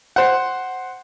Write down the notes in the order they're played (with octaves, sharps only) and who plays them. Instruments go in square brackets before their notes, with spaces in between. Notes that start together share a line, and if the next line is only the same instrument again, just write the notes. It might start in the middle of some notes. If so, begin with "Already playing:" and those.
[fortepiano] C5 F#5